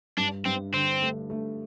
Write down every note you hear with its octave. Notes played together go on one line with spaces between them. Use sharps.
G2 D4
G2 C4
D3 C4
A3
A3